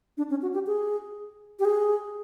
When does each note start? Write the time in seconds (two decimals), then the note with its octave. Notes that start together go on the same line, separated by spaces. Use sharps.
0.17 D4
0.30 C#4
0.42 F#4
0.54 G4
0.67 G#4
1.60 G4
1.65 G#4